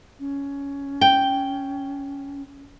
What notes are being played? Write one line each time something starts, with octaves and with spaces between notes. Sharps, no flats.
C#4
G5